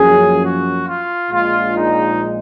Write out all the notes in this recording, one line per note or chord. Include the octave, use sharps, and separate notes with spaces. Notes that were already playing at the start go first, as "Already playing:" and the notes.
Already playing: F#2 F3 A#3 C#4 G#4
F#4
F4
A#1 A#2 G#3 F4
D#4